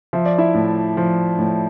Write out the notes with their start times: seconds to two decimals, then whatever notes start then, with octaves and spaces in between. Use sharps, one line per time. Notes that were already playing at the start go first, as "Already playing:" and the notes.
0.13 F3 E5
0.26 D5
0.38 E4 E5
0.54 A2
0.97 F3
1.39 A2